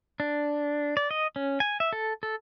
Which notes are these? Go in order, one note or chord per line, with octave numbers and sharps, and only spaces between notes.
D4
D5
D#5
C#4
G#5
E5
A4
A4